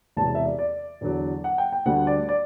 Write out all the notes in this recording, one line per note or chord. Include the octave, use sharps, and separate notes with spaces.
E1 E2 C3 A5
E5
D5
D5
E2 D3 F#3
F#5
G5
G5
D2 D3 G3 F#5
D5
D5